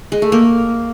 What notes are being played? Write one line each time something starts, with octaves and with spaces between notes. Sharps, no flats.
G#3
A3
A#3